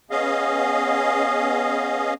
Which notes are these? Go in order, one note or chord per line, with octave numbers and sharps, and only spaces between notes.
B3 C#4 G#4 D#5 F5